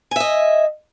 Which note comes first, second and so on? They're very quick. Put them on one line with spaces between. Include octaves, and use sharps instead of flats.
G#5 E5 D#5